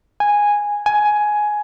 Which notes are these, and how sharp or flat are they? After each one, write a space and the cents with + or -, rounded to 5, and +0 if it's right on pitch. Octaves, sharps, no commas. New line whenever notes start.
G#5 -10
G#5 +10